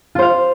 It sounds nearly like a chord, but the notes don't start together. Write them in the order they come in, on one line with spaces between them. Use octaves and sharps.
F4 C5 F5